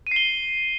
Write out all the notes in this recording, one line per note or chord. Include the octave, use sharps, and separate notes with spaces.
C7 D#7 G7